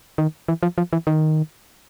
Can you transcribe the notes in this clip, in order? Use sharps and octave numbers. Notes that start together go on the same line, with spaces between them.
D#3
E3
F3
F3
E3
D#3